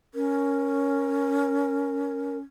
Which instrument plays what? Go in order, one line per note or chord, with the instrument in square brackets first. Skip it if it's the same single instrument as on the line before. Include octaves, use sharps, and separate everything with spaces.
[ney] C#4 [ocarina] A#4